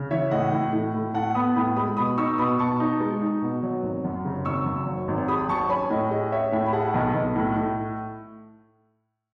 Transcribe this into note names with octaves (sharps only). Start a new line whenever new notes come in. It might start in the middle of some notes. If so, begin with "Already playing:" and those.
Already playing: C#3
E3 C#5 E5
A2 D#5 F#5
A2
A2
A2
A2 F#5 A5
B3 B5 D#6
A2 B5 D#6
G#3 B5 D#6
B2 B5 D#6
D#4 C#6 E6
B2 B5 D#6
B2 A5 C#6
D#4
G#3
D#4
B2
F#3
G#1
F#2
C#3
G#1 C#6 E6
F#2
F#3
G#1
G#4 B5 D#6
F#3 A5 C#6
C#4 G#5 B5
A2 D#5
G#4 D#5
C#4 C#5 E5
A2 E5 G#5
B5
G#4 F#5 A5
B1
B1
A2
A2